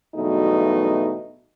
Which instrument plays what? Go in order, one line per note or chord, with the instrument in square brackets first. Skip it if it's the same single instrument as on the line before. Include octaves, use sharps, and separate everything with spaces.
[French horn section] E2 G2 B2 F#3 A3 D#4